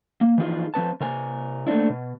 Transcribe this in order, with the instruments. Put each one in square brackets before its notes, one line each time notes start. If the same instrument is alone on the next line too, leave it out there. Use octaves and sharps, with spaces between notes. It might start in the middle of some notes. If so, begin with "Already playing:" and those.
[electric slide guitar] A#3
E3 F3 D#4 F4 G#4
F3 C4 B4 A5
C3 A#4 G#5
A3 A#3 C4 D4 E4
B2